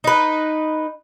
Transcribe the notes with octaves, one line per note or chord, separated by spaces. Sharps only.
D#4 B4